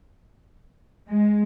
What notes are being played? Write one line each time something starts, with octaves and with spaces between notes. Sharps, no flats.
G#3